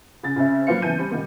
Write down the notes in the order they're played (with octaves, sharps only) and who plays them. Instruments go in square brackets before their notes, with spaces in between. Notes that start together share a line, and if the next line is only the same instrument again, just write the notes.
[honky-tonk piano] C#3 A6
C#3 C4 E5
F#3 A#3 B4 C5 F5 C#7
C#3 E3 B3 A5 G6 D#7
G3 C4
A#2 D#3 G3 A#3